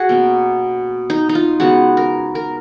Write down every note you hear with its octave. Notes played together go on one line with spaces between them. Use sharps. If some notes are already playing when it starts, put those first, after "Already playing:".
Already playing: F#4 G#4
B2 A#3 C#4
D#4
D#4
F4
C#3 G#3 B3 F#4
A#4
A#4